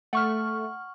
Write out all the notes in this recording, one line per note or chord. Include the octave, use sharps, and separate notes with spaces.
A3 F#5 C#6 F6